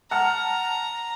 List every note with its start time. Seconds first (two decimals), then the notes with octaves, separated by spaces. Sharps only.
0.11 F#5 A5 A#5 F6